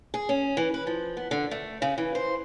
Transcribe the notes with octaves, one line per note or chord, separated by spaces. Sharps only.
G#4
C#4
E3
B4
F3
B3
D3
A3
C#3
E3
C5